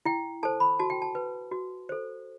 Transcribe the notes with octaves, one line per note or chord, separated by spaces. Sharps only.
E4 G5
A4 C5 A5
B5
F#4 A5
G5
A5
B4
F#4
A4 C5